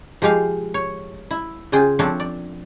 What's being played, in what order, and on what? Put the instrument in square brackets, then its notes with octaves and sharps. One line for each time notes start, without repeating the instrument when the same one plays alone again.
[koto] F3 G#3 G4 F5
C#5
E4
C#3 F4 G#4 G5
F3 A3 C4 D4 C#5
D5